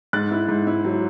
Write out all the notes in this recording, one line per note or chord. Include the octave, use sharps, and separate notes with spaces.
G#2 F#6 A6
E4
G#2
E4
F#3